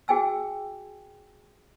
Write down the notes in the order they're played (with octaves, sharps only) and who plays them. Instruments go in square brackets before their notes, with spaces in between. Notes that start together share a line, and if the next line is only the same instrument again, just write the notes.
[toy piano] F#4 G#4 G5 G#5 E6